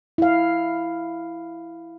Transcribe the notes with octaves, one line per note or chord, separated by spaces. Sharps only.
E4 F5